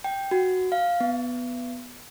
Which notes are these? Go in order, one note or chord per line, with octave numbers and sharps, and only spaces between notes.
G5
F#4
F5
B3